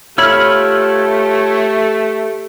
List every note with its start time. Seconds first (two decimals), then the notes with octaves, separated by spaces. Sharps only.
0.18 A3 F4 G4 C#5 B5 E6 F6